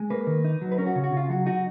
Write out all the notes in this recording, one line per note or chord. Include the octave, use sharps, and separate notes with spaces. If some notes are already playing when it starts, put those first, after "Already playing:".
Already playing: G#3
A#3 B4
D#3
D#4
F#3
B4
C#4 A#4
F#4
C#3
F#4
C#3 F4
F#3 F#4
D#4 F#4